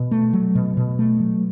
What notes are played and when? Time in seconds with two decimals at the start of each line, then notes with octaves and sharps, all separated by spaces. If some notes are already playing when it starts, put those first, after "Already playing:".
Already playing: B2
0.11 A3
0.33 F#3
0.55 B2
0.77 B2
0.99 A3
1.20 F#3